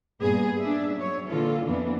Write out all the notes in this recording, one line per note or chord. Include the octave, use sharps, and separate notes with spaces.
G2 A#2 B3 G#4
D4 E5
F#3 C#5
A#2 D3 E3 F4 A4
F2 E3 A#3 B3 D4